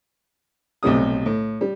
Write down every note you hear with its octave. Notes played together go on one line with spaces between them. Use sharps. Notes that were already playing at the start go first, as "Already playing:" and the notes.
B1 A2 C3 G3 D#6
A2
G3